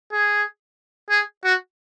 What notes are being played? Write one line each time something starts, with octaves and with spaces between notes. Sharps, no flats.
G#4
G#4
F#4